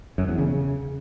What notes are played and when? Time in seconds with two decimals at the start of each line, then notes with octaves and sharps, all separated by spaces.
0.18 F#2
0.28 E2
0.38 C#3
0.48 C#3